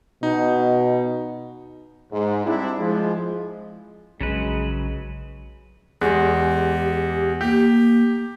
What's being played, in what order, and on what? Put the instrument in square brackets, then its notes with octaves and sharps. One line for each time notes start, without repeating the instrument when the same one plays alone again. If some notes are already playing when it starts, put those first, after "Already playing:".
[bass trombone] B2 [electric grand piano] D#4
[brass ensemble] G#2
G3 C4 D4 E4
F3 G#3
[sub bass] A#1 [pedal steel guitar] C#3 F#3 B4 [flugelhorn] G#3
[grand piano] E2 G#3 [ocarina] G4
[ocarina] A#3 [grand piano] G4